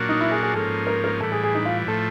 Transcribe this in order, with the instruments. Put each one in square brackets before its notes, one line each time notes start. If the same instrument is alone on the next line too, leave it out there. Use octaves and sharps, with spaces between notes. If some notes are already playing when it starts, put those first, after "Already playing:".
Already playing: [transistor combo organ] A#2 F#3 A#3 D4 F#4
[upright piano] D#4
E4
G#4
G#4
[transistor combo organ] G#2 F3 A#3 C#4 [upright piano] A4
[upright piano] A#4
A#4
[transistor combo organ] A2 E3 G3 [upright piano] A4
[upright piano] G#4
G#4
D#4
F4
[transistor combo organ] A2 F3 A3 [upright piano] A4